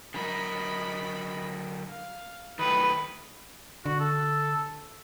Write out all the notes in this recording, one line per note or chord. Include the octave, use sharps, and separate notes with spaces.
D3 F#3 A#4 D#5 B5
F5
D#3 F#3 A3 B4 G5 D#6
D3 F#4
A4